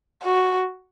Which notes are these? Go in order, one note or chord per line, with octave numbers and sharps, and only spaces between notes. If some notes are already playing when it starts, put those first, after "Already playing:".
F#4